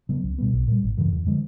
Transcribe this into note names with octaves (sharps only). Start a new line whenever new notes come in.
C#3 F#3 B3
C#2
B2 G3 B3
B1
A#2 G3
G#1
F#2 C#3 E3
F2
D3 F3 G#3